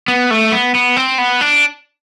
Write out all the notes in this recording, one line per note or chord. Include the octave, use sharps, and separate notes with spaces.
B3
A3
B3
B3
C4
B3
D4